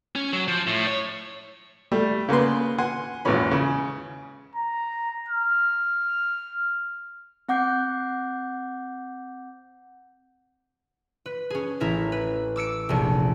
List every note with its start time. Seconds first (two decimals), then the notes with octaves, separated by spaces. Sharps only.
0.16 C#4
0.33 F#3
0.48 F3
0.67 A2
0.87 C#5
1.92 G3 A3
2.29 C#3 A#3 B3 B4 C6
2.78 F#5 G#5 C6
3.25 G#1 E2 A#2 G#3 C#4 B5
3.51 C#3
4.56 A#5
5.29 F6
7.49 C4 F#5 D6 G6 C7
11.26 B4
11.50 C#4 G#4
11.80 A1 E4 A#4 B6
12.12 B4
12.56 D6 E6 C#7 D7
12.89 F1 A#1 D7